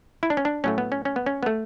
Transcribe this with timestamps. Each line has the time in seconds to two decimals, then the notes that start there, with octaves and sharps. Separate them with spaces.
0.23 E4
0.30 D4
0.37 C#4
0.45 D4
0.64 A2 F#3 A3 C#4
0.78 B3
0.92 C#4
1.05 C#4
1.16 B3
1.26 C#4
1.43 B3
1.46 A3